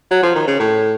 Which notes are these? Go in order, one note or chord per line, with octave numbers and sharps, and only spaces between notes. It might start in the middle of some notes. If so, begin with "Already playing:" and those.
F#3
F3
D#3
C#3
A2